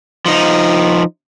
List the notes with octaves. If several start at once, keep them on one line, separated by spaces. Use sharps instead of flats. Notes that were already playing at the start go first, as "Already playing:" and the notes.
F3 D#4